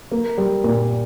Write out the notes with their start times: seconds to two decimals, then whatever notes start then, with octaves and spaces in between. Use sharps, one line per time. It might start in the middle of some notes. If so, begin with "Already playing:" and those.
0.12 A#3
0.38 G3
0.64 A#2